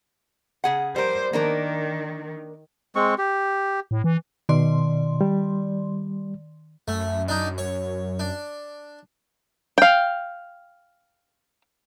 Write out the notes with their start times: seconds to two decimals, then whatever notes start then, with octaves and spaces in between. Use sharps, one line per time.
0.64 C#3 G#4 F#5
0.96 G3 A#4 C5
1.33 D#3 A#3 D4 A#4
2.96 G#3 C4 C#6
3.18 G4
3.91 A2
4.04 E3
4.49 B2 D#3 D5 C6
5.21 G3
6.88 F#2 A3
7.28 D4 D#4
7.58 C#5
8.20 D4
9.78 F5 G5